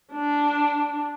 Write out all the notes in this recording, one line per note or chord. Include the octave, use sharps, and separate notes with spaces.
D4